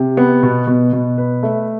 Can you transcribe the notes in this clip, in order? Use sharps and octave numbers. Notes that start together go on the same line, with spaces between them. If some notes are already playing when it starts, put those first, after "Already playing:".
Already playing: C3
B3
B2
B2
B2
B4
A3